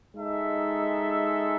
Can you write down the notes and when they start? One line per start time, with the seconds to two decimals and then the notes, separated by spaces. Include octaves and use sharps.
0.14 G#3 D#4 A4 E5